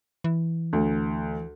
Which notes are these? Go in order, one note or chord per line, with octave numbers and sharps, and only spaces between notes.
E3
D2